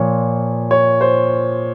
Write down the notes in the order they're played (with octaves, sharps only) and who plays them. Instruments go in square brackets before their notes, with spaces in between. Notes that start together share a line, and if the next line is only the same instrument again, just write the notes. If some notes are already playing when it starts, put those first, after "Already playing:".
Already playing: [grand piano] A#2 F3 C#5
C#5
C5